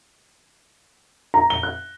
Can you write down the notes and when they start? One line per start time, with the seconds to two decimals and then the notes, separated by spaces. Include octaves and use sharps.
1.34 A#5
1.50 G7
1.63 F#6